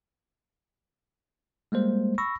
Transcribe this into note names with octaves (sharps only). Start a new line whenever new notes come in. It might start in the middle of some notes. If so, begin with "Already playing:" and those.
G3 G#3 A#3 C5
B5 C#6 E6 A#6